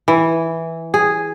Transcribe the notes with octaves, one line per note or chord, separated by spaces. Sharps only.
E3
G#4